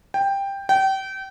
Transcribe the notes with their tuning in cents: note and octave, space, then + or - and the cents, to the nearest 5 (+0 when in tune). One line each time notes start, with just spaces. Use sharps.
G5 +10
G5 -30